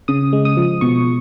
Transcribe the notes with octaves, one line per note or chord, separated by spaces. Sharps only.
C#3 D#6
G#3
D#6
F3
B2 C#6